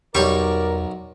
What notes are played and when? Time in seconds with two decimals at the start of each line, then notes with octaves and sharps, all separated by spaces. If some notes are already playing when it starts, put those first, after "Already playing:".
0.15 B1 E2 G3 A#4 C#5 D5 C#6